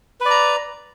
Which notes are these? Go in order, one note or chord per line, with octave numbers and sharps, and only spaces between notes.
B4 D5 A#5